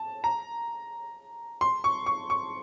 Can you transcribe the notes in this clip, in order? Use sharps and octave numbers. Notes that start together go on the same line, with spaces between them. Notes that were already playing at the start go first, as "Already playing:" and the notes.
Already playing: A5
A#5
C6
C#6
C#6
C#6